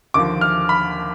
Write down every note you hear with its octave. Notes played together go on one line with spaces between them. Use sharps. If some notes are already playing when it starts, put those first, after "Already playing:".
D#2 D3 F3 D6
F6
B5